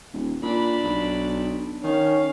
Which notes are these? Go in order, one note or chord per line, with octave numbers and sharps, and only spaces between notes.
D#1
A#2 D4 B5
B1
D#3 C#4 F5